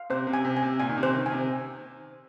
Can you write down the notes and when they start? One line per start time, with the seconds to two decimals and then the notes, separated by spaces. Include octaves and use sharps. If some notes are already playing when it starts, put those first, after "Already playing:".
Already playing: F5
0.10 C3 C5
0.27 C3
0.34 G#5
0.45 C3
0.57 G#5
0.63 C3
0.80 A#2 G#5
0.89 D#3
0.97 C3
1.03 C5
1.15 D#3
1.26 G#5
1.32 C3